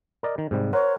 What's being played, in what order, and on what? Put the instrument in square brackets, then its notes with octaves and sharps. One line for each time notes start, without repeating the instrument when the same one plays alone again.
[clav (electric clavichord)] A#4 D5 D#5
D#3
G#2 C3 G3
[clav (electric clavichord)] A#4 C5 F#5 [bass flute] C#5